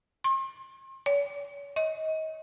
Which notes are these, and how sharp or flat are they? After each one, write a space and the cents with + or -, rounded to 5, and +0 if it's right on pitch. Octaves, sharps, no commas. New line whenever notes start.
C6 +45
C#5 +40
D#5 +25